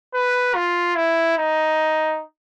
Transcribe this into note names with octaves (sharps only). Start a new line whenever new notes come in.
B4
F4
E4
D#4